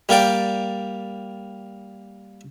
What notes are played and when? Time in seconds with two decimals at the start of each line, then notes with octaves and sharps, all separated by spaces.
0.09 G3 A#3 D5 G5